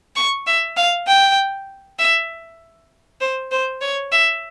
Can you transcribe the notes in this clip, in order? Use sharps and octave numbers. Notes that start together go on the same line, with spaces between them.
C#6
E5
F5
G5
E5
C5
C5
C#5
E5